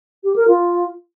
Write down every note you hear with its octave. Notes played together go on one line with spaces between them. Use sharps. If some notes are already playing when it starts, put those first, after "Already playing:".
G4
A#4
F4